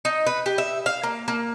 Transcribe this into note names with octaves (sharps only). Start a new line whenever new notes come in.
D#4
B4
G4
E5
F5
A#3
A#3